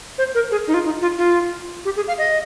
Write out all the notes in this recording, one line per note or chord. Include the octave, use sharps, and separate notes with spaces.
C5
A#4
G#4
D#4
F4
D#4
F4
F4
G4
G#4
F5
D#5